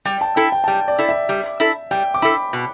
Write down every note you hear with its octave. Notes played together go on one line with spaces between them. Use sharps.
G3 G5
A5
E4 A4 G5
G5
A5
G3 G5
D5
E4 A4
E5
G3
E4 A4
G3 G5
D6
E4 A4 B5
B2